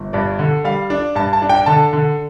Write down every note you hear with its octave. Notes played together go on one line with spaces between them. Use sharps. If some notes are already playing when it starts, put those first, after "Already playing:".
Already playing: G1
G2 D5
D3
G3 F5
D4
G2 A5
A5
D4
G5
D3 A5
D3